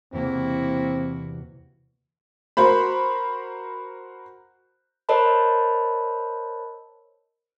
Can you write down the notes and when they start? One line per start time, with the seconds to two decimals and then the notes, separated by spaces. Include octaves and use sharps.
0.13 E2 C3 A#3 C4 E4 F#4
2.57 F#4 A#4 C5 B5
5.09 A#4 C5 C#5 D#5 A5 B5